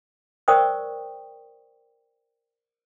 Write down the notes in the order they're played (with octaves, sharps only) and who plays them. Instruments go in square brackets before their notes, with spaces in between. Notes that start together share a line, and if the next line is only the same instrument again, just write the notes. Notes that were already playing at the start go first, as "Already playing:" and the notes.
[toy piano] A#4 C5 D5 G5 C#6 D#6